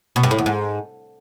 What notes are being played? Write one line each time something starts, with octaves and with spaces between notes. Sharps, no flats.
B2
G2
A2
E2
G#2